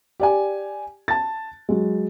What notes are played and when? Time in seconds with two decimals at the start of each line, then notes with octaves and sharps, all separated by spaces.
0.20 G4 D5 G#5
1.08 A5 A6
1.69 F#3 G#3